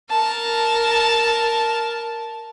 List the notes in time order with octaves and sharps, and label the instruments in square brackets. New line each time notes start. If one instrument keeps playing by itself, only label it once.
[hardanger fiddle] A#4 A5